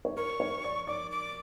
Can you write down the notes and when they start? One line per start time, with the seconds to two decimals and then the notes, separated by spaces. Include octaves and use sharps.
0.05 C#5
0.17 A#4 C#6
0.40 C#5
0.64 D5
0.87 D5 D6
1.11 D6